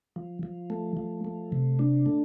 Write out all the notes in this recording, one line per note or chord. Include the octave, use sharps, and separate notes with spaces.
F3
F3
A3
F3
A3
C3
D4
A3